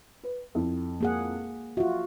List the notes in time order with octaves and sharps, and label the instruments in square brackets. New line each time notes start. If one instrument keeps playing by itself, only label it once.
[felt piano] B4
F2 E4
[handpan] A#3 G#4 F#5
[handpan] F4 F#4 [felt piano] E5